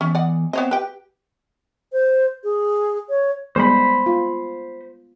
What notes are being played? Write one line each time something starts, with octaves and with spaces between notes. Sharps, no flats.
E2 C#4
D5 D#5 F#5
B3 C4 C#5 D#5
G4 B4 G5
C5
G#4
C#5
G3 G#3 B3 C5 B5
F4